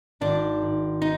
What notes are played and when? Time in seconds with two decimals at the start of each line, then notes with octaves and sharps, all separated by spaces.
0.21 G#1 D4
0.62 G#2
1.02 D#4